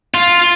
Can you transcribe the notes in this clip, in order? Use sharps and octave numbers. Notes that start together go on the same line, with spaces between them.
F4